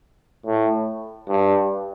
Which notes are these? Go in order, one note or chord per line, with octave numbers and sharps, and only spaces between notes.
A2
G2